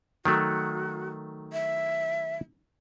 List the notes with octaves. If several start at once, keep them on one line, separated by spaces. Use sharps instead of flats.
D#3 F#3 A3 F#4
E5